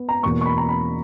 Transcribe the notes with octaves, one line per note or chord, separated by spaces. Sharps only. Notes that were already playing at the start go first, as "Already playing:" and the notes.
Already playing: B3
A#5
E2 B2 A#3 C#6
C#6
B5
A#5
B5